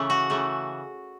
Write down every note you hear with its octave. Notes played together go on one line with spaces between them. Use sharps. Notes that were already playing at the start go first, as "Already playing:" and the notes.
Already playing: C#3 E3 A3
F#4
C#3 E3 A3